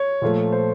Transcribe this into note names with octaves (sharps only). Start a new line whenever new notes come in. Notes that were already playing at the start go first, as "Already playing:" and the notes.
Already playing: C#5
A#2 F3 A3
C5